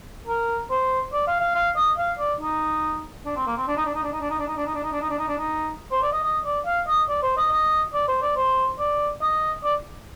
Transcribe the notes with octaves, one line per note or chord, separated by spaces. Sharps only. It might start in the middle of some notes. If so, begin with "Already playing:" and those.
A#4
C5
D5
F5
F5
F5
D#5
F5
D5
D#4
D4
C4
A#3
C4
D4
D#4
D4
D#4
D4
D#4
D4
D#4
D4
D#4
D4
D#4
D4
D#4
D4
D#4
D4
D#4
D4
D#4
C5
D5
D#5
D#5
D5
F5
D#5
D5
C5
D#5
D#5
D5
C5
D5
C5
D5
D#5
D5